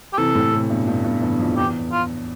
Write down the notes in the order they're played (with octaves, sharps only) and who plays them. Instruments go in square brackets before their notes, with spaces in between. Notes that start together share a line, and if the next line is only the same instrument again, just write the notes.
[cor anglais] G4
[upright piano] C3 E3 [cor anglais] A4
[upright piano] A2 C3
A2 C3
G2 B2
G2 B2
G2 B2
E2 G2
F2
[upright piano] E2 [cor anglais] G4
[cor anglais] F4